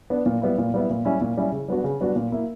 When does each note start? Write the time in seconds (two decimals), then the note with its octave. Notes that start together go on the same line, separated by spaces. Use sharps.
0.10 B3 D4
0.26 A#2
0.42 G3 B3 E4
0.58 A#2
0.74 G3 B3 E4
0.90 A#2
1.05 G3 C#4 E4
1.21 A#2
1.37 G3 C#4 E4
1.52 C#3
1.68 G3 B3 D4 F#4
1.84 C#3
2.01 G3 B3 D4 F#4
2.16 A#2
2.32 A#3 E4